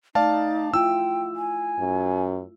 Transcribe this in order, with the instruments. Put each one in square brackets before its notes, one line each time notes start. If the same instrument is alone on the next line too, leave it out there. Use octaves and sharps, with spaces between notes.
[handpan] A3 [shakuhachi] D#4 [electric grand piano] D5 F5 A5
[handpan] E4 F4 [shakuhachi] G5 [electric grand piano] E6
[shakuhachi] G#5
[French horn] F#2